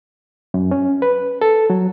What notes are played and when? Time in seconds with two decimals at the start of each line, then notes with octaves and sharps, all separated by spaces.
0.54 F#2
0.71 C#4
1.02 B4
1.41 A4
1.70 F#3